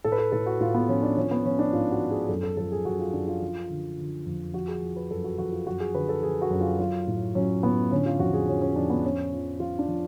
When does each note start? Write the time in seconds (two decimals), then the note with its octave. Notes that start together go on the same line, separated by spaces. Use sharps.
0.04 A2 A4
0.12 B4
0.19 A4
0.32 A2 A4
0.46 F#4
0.61 A2 F4
0.74 B3
0.88 F3 C#4
1.03 D4
1.17 F3 C#4
1.31 B3
1.45 F3 C#4
1.59 D4
1.73 G#2 F4
1.92 F#4
2.01 F3
2.10 G#4
2.29 F#2 A4
2.43 A4
2.57 F3 A4
2.72 G#4
2.85 F#2 F#4
2.99 F4
3.13 F#2 D4
3.27 F4
3.42 F3
3.70 D3
3.98 D3
4.26 F2
4.54 F3 F#4
4.68 G#4
4.82 F3
4.96 B4
5.10 F#2 A4
5.24 F#4
5.38 F3 F#4
5.52 F4
5.66 F#2 F#4
5.80 G#4
5.94 D3 B4
6.09 A4
6.23 F3 G#4
6.42 F#4
6.51 F#2
6.61 F4
6.79 F#3 F4
7.07 A2
7.35 F#3 C#4
7.63 A2 B3
7.91 D3 C#4
8.06 F4
8.19 F2 F#4
8.33 G#4
8.47 F3 C#4
8.62 C#4
8.76 F2 D4
8.90 B3
9.04 F3 C#4
9.32 F3
9.60 F3 F4
9.79 D4
9.88 F3